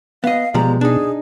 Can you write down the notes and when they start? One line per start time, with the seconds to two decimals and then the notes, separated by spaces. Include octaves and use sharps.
0.24 B3 D#5 F5
0.54 B2 F3 G3 G#3 A#5
0.81 D4 D#4 G#4